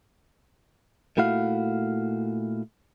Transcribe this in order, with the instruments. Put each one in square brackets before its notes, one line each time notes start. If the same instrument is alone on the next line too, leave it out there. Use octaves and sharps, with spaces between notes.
[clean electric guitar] A#2 A3 E4 F#4 F5